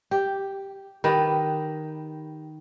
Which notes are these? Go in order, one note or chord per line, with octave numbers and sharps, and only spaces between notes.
G4
D#3 G4 B4